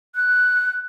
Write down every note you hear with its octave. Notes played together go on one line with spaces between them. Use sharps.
F#6